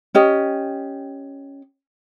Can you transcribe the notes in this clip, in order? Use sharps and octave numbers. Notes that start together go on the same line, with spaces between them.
C#4 G4 D#5